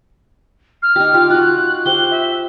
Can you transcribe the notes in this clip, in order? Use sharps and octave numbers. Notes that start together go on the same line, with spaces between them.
F6
D#4 G4
F4 G4
F4 F#4 F#6
G4 C5 G7
E5